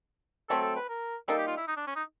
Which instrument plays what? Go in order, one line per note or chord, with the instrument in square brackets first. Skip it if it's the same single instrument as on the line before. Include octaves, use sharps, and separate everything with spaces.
[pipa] F#3 A3 C4 [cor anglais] A4
[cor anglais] A4
B4
A#4
[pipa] G3 A#3 D#4 [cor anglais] A4
[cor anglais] G4
F4
E4
D#4
D4
C#4
D#4